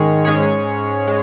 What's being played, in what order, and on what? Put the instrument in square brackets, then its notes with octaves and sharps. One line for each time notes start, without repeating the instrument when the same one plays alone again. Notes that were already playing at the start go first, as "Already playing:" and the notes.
Already playing: [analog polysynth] G#2 G#3 C#4 G#4 C#5 [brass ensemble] D#3
[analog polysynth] G#2 G#3 C#4 G#4 C#5
G#3